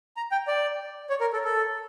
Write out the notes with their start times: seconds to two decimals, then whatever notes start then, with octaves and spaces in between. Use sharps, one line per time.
0.17 A#5
0.32 G5
0.47 D5
1.09 C#5
1.21 A#4
1.33 A4
1.44 A4